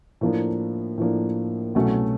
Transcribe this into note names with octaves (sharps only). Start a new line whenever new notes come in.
A2 F3 A#3 D4
A2 F3 A#3 D4
C2 B2 F#3 A3 C#4